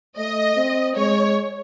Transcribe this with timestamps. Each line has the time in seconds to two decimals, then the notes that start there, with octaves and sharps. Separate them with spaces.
0.17 A3 D#5
0.56 C4
0.96 G#3 C#5